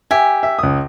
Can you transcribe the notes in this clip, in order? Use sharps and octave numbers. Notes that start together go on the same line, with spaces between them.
G4 E5 G#5
E5
C#2 D#6